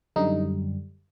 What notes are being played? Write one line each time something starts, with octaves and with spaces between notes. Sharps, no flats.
F#2 D3 G3 D#4